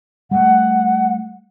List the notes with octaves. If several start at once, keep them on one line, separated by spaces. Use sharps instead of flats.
G3 A3 F#5